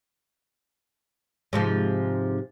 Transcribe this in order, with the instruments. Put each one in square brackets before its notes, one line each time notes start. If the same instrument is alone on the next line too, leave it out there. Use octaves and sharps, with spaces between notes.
[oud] G#2 C3 F3